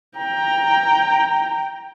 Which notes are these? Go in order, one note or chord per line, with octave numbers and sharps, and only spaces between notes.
G5 A#5